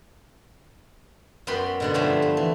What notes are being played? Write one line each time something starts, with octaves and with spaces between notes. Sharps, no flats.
F#2 B3 B4 G5 B5 C6
B2 D3 B3
G2 F3 A3 G5 G#5
A3
E3